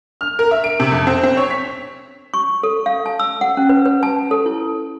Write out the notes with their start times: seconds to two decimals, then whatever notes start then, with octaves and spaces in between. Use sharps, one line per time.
0.21 F6
0.39 A#4
0.51 E5
0.64 D7
0.80 C3
0.92 F2
1.07 C4
1.23 C4
1.37 C#5
1.50 B6
2.34 C#6
2.63 A4
2.86 F5
3.06 A5
3.20 E6
3.41 F#5
3.57 C#4
3.69 B4
3.86 B4
4.03 A5
4.31 A4
4.46 E4